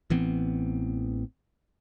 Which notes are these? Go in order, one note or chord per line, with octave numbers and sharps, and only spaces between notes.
A1 E3 B3 C4